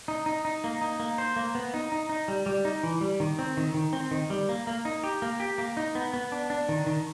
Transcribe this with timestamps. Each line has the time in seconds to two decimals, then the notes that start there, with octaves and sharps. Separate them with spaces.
0.08 D#4
0.26 D#4
0.45 D#4
0.64 A#3
0.81 D#4
1.00 A#3
1.18 C5
1.36 A#3
1.55 B3
1.74 D#4
1.92 D#4
2.09 D#4
2.28 G3
2.46 G3
2.65 D#4
2.83 E3
3.01 G3
3.20 D#3
3.39 C4
3.57 D#3
3.74 D#3
3.93 C4
4.11 D#3
4.30 G3
4.49 A#3
4.67 A#3
4.85 D#4
5.04 G4
5.22 A#3
5.40 G4
5.58 A#3
5.77 D#4
5.95 B3
6.14 B3
6.32 D4
6.50 D4
6.69 D#3
6.87 D#3